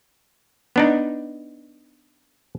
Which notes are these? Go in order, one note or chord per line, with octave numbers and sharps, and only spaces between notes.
B3 D4 D#4